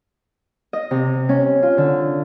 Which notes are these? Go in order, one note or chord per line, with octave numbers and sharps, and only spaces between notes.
D#5
C3
C#4
F4
D3